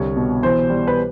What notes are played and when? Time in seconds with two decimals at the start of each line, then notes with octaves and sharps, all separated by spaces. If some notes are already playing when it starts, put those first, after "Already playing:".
Already playing: C2 D3 C#5
0.16 B2
0.43 E3 C5
0.70 G3
0.87 B4